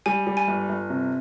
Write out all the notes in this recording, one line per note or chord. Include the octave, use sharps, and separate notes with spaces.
G3 G#5
G3
G#5
G1
G1
C3